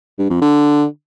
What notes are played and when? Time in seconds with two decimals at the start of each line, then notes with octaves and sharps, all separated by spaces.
0.19 G2
0.30 F2
0.41 D3